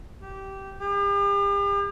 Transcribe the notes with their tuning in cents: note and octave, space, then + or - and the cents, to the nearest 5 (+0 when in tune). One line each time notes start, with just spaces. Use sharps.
G4 -15
G4 +45